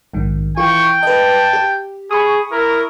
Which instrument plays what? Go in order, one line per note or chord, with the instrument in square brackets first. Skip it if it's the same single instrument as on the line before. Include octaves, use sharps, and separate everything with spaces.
[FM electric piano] A#1 G#2 D#3
[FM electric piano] E3 F4 [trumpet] G5 [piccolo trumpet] C#6
[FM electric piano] B4 D#5 [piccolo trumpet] A5
[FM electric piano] G4
[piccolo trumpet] G#4 [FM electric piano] B5 C#6 D#6
[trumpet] E4 [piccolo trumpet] A#4